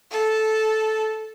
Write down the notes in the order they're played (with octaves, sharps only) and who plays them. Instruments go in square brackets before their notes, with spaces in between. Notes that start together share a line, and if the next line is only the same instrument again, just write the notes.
[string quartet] A4